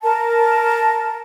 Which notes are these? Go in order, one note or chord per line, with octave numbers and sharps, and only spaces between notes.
A#4 A5